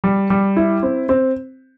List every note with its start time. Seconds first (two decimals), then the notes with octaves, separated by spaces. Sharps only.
0.04 G3
0.30 G3
0.57 E4
0.83 C4
1.09 C4